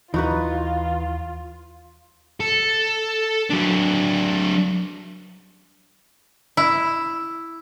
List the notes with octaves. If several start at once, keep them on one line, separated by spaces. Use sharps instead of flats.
D#2 E3 D#4 F4 F#4 B4
A4
F#3 D4
E4